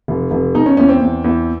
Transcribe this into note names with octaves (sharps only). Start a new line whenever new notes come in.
F1
F1
B2 D#4
C#4
E2 C#4
C4
E2
E2